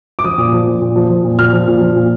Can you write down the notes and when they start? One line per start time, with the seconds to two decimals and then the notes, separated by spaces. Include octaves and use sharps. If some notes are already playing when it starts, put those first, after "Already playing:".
0.19 D6
0.24 F3 D#6
0.38 A#2
0.53 F3
0.67 A#2
0.81 A#2
0.96 F3
1.10 F3
1.24 A#2
1.39 A#2 F6
1.53 F3
1.67 A#2
1.81 F3
1.96 A#2